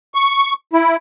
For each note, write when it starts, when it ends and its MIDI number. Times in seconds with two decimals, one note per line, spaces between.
0.14 0.53 85
0.73 0.96 64